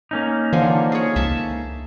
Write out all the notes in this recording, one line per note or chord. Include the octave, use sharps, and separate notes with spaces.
A#3 C#4 D#4
D3 E3 F3 G#5
G#4 C#5
C#2 E5 A5